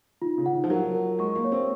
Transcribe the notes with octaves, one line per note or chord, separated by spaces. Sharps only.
D#3 F4
C#3
F#5
D#3
F3
F#3 A#4
A#4
G#3 C#6
A#3
C#5
C4